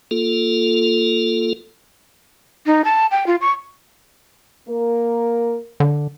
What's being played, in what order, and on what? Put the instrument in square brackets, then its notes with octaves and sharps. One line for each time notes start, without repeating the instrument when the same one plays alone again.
[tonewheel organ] A#3 F4 A4
[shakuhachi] D#4
A5
G5
F4
C#6
[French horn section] A#3 A#4
[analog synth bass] D3